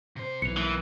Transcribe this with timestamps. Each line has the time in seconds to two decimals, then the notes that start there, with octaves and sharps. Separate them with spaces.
0.16 C3 C5
0.42 B1 E3 C#7 F7
0.57 E3 A#3 B3